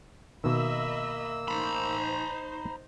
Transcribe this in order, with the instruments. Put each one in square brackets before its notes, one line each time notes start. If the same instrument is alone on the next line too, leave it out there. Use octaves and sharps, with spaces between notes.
[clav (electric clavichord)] B2 D#3 [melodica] A#3 E6 [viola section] D#5 E5 B5
[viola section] D#4 C5 [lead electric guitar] A#5 B5